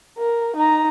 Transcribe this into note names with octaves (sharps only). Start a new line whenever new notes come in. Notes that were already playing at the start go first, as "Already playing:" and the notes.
A#4
D#4 A#5